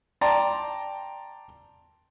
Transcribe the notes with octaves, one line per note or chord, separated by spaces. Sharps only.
D5 G5 A5 A#5 C6